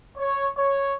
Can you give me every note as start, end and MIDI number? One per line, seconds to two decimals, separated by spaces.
0.17 0.46 73
0.57 0.94 73